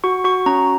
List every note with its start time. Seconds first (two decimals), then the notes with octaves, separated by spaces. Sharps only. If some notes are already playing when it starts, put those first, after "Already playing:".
0.04 F#4 C#6
0.24 F#4 C#6
0.46 C#4 A#5